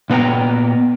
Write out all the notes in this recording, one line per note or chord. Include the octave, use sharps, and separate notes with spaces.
A#2 B3 B4 G5 A#5